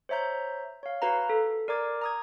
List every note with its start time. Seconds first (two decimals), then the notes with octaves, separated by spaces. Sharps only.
0.09 C5 C#5 E5 A#5 G6
0.83 C#5 F5
1.02 F#4 B4 F5 A#5
1.30 A4
1.68 A#4 D5 A#5 D6 G#6
2.02 A#5 D#6 G#6